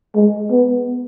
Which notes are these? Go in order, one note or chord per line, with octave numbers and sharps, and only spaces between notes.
G#3
B3